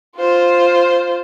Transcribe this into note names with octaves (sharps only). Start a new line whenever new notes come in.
F4 C5